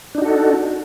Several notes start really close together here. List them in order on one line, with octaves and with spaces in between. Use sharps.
D4 D#4 F#4 A4